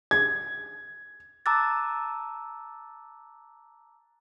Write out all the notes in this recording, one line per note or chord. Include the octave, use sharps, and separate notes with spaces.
G#6
A5 A#5 D6 E6 F#6 A6